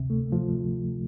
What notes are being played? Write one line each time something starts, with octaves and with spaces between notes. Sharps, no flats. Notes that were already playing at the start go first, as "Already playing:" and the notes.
Already playing: D2 C3
A3
F3